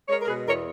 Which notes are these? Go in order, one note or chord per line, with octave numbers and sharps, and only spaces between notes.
G#3 A#4 C#5
A#4
B2 G#4 B4
E2 A#4 C#5